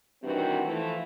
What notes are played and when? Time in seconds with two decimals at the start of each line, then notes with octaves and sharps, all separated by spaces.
0.23 G2 C3 D#3 E3 C4 F#4
0.65 E3 F3 A3